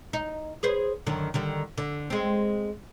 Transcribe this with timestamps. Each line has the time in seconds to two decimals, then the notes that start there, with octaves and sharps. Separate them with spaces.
0.13 D#4
0.63 G#4 B4 C5
1.06 F#2 D3 D#3
1.34 D3 D#3 G3
1.78 D3
2.10 G#3 C4